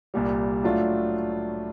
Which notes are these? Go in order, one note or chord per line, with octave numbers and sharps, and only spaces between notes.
C2 A#2 G3
A2 F#3 A3 D4 F4